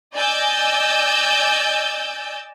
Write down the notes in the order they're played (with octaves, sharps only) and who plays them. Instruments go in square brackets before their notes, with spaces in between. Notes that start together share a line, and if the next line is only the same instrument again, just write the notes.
[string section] D5 D#5 G#5 E6 G6 A6